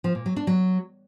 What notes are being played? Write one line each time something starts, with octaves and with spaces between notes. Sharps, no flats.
F3
A#2
F#3
D4
F#3